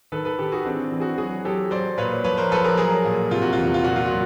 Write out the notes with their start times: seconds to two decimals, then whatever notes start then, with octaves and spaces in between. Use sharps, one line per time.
0.12 D#3 A4 B4
0.25 A4 B4
0.39 D#3 G4 A4
0.52 F#4 G#4
0.65 E3 C4 D4
0.92 E3
1.00 F#4 G#4
1.18 F#3 F#4 G#4
1.45 F#3 G4 A4
1.71 F#3 C5 D5
1.98 A#2 B4 C#5
2.24 F3 B4 C#5
2.37 A#4 C5
2.51 F3 A4 B4
2.64 G#4 A#4
2.77 F#3 G#4 A#4
3.04 A#2
3.31 C3 F4
3.42 F#4
3.53 E2 F4
3.64 F#4
3.74 F4
3.84 A#2 F#4
3.96 F4
4.06 F#3 F#4